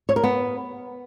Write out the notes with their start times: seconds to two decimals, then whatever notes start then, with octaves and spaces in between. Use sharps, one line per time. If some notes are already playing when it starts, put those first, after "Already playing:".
0.09 C#5
0.16 A#4
0.24 B3